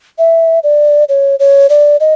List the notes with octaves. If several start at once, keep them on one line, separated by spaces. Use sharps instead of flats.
E5
D5
C#5
C#5
D5
D#5